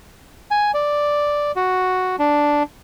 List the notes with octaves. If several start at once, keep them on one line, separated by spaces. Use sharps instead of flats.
G#5
D5
F#4
D4